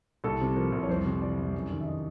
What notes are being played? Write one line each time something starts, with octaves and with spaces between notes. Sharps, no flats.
C2 A4
C3
F3 A#4
C2
C#5
F2 C5
C3
E3 D5
F2
F#2
D#3
E5
D#5